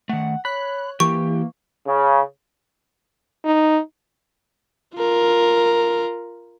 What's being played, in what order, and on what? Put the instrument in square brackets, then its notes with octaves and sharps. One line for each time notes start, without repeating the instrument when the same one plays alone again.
[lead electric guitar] D#3 A3 [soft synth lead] F#5
[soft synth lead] C#5 [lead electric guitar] B5 [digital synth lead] F#6
[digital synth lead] E3 [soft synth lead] A#3 [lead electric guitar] G4 [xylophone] C#6
[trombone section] C#3
[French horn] D#4
[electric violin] F4 A#4